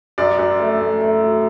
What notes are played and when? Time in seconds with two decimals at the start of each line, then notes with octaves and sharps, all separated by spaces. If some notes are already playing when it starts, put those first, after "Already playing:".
0.18 F#2 D5
0.39 F#2
0.60 A3
0.80 A3
1.01 A3
1.22 F#3